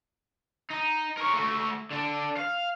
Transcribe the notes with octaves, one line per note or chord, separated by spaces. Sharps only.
D#4
A#4 C#5
A3 F#4
D3 D4
F5